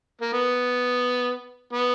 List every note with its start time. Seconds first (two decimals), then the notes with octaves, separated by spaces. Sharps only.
0.22 A#3
0.33 B3
1.73 B3